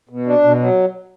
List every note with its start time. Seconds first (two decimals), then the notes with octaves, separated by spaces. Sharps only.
0.09 B2
0.27 D4
0.43 B2
0.60 F#3